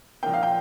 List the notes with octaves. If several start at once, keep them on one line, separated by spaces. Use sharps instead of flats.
A#2 F3 A#3 G5
F5
G5